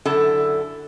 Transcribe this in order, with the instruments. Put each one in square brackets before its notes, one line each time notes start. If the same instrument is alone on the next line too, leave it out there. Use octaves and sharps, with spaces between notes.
[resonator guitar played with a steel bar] F#2 D3 E4 A4